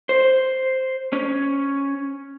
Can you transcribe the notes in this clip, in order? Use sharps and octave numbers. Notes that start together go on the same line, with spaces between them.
C5
C#4